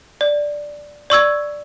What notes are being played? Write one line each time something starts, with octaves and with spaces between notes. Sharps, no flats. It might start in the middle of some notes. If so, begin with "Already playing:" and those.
D5
D5 C#6 E6 G#6